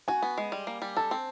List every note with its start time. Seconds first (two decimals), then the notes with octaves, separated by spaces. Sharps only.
0.08 F#4 G#5
0.23 B3
0.38 G#3
0.52 G3
0.67 A#3
0.82 G3
0.97 A4 A5
1.11 C4